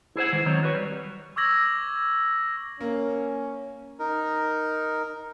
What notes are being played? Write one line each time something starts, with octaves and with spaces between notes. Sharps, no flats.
E4 G#4 C5 F#5
D#3 E3 G#3
D#3 F#3 C4 C#5
F#4 B4 C#5
G3
C#6 D6 E6 G#6 A#6 F#7
A#3 C#4
D#4 A#4